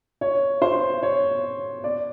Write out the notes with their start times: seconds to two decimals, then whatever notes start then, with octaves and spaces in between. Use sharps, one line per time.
0.21 C#5
0.62 C5
1.03 C#5
1.84 D5